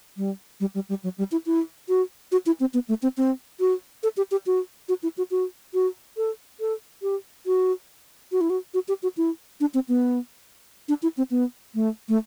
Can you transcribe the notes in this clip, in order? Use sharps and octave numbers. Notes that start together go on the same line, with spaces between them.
G3
G3
G3
G3
F#3
G3
E4
E4
F#4
F#4
E4
C4
B3
A3
C4
C4
F#4
A4
G4
G4
F#4
F#4
E4
F#4
F#4
F#4
A4
A4
G4
F#4
F#4
E4
F#4
F#4
G4
F#4
E4
D4
C4
B3
D4
E4
C4
B3
A3
A3